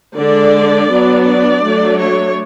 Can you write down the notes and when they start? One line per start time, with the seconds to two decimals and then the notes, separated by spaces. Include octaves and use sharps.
0.16 D3 G#3 D4 D5
0.89 F#3 B3 D4
1.25 D5
1.62 F#3 A3 D4
1.98 C#5